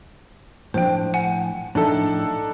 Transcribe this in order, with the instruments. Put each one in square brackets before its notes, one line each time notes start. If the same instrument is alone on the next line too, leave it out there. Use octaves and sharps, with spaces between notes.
[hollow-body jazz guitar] A2 F3 D4 [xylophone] C5 G5
[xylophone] F#5 G#5
[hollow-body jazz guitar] A2 F3 E5 [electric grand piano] D4 D#4 A4